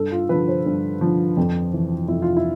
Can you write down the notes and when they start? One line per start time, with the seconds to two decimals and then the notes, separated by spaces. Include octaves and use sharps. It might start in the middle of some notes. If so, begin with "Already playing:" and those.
Already playing: G2 A4
0.12 F4
0.29 D3 F3 B4
0.48 C5
0.66 G2
1.01 D3 F3
1.37 F2
1.74 E3
2.08 F2 E4
2.22 F4
2.37 E4